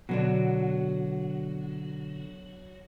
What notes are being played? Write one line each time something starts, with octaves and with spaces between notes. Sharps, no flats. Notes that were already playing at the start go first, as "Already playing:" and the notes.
B2 D3 F#3 D4 F#4